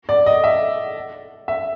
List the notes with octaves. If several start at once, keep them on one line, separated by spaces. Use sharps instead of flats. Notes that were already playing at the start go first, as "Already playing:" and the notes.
D5
D#5
E5
E5